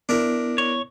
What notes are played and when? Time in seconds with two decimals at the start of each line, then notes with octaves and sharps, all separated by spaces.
0.09 B3 D4 E4 A#4 E5
0.58 C#5